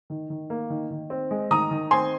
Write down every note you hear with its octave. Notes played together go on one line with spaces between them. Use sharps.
D#3
D#3
A#3
D#3
D#3
C4
G#3
D#3 A#5 D#6
D#3
C4 G#5 C6